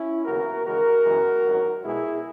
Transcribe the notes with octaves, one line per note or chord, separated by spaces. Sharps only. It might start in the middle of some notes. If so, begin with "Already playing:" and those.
Already playing: C#4 E4
D#2 C#3 F#3 B3 F#4 A#4
D#2 C#3 E3 G#3 F#4 A#4
F#2 E3 G#3 B3
G#1 F#2 D#3 F#3
B1 B2 G#3 B3 E4 G#4